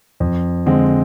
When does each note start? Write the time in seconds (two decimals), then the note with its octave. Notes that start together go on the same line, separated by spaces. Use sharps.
0.20 F2
0.66 D3 G#3 C4